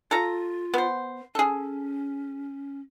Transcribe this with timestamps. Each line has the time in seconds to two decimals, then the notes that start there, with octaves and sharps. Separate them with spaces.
0.11 F4 A4 F5 A#5
0.74 B3 C5
1.35 C#4 G#4 A4